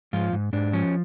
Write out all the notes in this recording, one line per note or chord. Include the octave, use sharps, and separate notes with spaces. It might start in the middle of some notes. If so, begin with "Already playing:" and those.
G#2 F3 F4
G#2
G#2 D4
F3 C#4